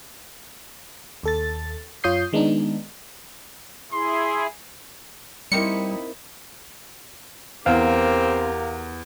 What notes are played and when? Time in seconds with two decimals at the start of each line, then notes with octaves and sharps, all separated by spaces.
1.23 D#2 A4 A6
2.04 F#2 F4 C#5 D#6 G6 C7
2.33 D#3 G#3 B3 D4 D#4
3.92 E4 G#4 C6
5.52 G3 A#3 C4 D#4 E4 G4 C#7
7.66 E2 C4 G4 A#4 F5